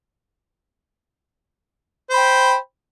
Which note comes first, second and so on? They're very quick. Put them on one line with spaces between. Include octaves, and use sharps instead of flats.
C5 B5 G5